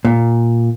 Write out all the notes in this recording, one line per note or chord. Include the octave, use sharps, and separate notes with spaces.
A#2